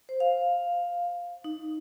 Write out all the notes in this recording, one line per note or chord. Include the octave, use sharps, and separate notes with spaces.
C5
F5
D#4